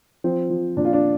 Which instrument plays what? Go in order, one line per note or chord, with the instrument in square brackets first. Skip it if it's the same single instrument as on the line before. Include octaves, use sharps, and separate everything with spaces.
[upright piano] F3 C4
F3
A#2 D4
F4
D4